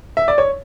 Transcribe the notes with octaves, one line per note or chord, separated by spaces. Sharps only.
E5
D5
C#5